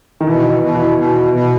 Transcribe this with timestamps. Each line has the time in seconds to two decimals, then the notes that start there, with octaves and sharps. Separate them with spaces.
0.21 D#3
0.27 B2 E3
0.62 B2
0.74 E3
0.98 B2
1.34 B2